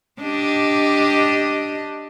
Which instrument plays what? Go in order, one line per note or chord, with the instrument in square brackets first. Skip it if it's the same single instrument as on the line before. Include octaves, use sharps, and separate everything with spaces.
[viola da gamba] D4 G4 D#5